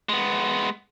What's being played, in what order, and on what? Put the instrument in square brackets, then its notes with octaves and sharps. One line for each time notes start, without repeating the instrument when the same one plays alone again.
[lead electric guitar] G#3 B3